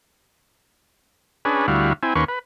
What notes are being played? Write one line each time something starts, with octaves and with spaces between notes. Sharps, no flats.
C#4 D4 G#4 B4
D2 G3 E4 F#4 F5
C4 E4 G#5
D#2 A#3 C#4 B4 C6 C#6
B4